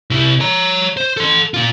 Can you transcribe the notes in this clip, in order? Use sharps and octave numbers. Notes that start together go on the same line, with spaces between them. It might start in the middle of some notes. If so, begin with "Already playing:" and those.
C3 E4
C#5 A#5
C5
A4 C6
A#2 F4